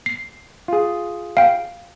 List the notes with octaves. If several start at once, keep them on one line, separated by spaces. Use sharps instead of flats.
C7
F4 G#4
F5 G5